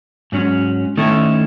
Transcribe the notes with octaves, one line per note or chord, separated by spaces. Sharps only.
G#2 F#3 C#4
D#3 A3 C#4 E4